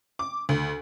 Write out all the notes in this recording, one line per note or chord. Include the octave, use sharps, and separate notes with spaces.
D6
D2